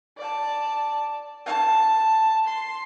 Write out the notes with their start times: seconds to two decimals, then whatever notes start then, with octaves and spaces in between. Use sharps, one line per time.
0.17 D5 A5
1.46 A5
2.46 C6